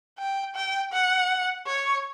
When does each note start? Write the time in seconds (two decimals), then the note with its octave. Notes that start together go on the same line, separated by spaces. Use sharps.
0.18 G5
0.55 G5
0.92 F#5
1.67 C#5